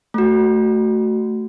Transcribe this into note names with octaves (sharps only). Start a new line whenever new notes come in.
A3 F#4